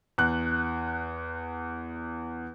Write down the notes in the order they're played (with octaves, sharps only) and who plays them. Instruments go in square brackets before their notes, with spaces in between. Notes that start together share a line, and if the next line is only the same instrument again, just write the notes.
[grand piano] E2 F#6